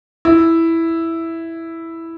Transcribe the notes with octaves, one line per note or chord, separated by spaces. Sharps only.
E4